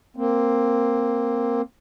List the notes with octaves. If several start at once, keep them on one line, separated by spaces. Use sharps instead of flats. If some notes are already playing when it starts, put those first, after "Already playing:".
A#3 C4